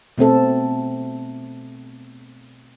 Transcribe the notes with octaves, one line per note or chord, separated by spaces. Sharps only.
B2 A3 C4 A4